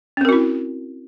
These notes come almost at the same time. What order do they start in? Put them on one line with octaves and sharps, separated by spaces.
C#4 C4 A#4 F#4 E4